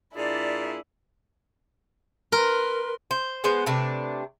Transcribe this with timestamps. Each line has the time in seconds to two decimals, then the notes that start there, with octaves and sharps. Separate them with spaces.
0.15 A#2 D4 E4 G#4 D5
2.32 A#4 B4 C6
3.11 C5
3.44 G#3 B3 C5
3.66 C3 A3 D4 B4